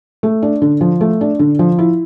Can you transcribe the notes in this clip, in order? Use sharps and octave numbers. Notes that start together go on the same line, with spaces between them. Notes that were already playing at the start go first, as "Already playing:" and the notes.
A3
D4
D3
F3
A3
D4
D3
F3
E4